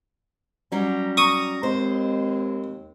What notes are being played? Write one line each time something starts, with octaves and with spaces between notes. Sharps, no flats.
F#3 G3 C#4 A#5
A#5 C#6 D#6
D#2 G#3 C4 C5